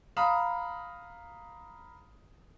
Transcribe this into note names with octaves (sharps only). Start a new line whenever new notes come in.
F5 A#5 B5 D#6